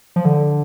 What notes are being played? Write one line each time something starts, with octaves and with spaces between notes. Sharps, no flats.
F3
D3